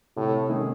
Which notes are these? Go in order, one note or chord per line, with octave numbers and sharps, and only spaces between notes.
A2 C3
D#3 G#3 C#4 G#4